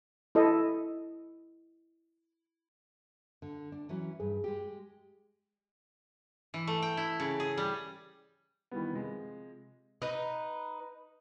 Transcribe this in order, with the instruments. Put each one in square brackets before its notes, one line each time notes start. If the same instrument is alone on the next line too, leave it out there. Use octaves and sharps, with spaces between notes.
[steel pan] E4 A4 D#5
[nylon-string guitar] D3
D4
E3 F#3 C#4
[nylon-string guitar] G2 [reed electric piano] G#4
[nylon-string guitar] G#3 G4
[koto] E3
A3
G5
E4
C#3
G#4
G3
[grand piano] D#3 E3 G3 B3
C3 F3 G#3
[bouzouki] D#4 B4